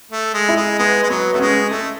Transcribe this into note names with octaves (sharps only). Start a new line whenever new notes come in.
A3
G#3
E4
G#3
G#3 B3
G#3
F#3 B3
A3 B3
G#3 C#4
A3 A4